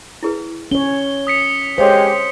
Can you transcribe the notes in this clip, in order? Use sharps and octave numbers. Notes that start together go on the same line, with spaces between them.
E4 G#4 B4
C#4 C#5 G7
D#6 B6 C#7
G#3 G4 A4 C5 C#5 F5